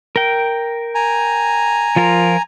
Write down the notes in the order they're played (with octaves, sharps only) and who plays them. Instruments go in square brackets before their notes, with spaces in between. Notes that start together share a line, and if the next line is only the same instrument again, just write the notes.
[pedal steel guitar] A#4 G5
[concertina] G#5 A#5
[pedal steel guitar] F3 F4 A#4